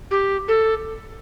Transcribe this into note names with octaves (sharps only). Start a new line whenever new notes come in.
G4
A4